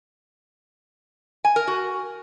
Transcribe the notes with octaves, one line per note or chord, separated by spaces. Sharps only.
G#5
A#4
F#4